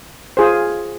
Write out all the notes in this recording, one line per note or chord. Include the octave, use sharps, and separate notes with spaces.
F4 G#4 C5